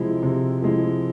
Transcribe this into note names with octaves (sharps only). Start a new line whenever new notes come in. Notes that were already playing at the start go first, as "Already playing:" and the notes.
Already playing: C3 F3 G#3 E4
C3
F3 G#3 E4